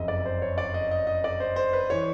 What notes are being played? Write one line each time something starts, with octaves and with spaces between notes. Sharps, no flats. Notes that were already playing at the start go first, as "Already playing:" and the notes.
Already playing: F#1 F2 C#3 D#5 E5
D5
C5
C#5
D5
D#5
D#5
D#5
D5
C5
C5
B4
E3 C#5